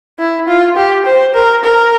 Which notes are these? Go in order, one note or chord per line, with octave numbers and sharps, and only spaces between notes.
E4
F4
G4
C5
A#4
A#4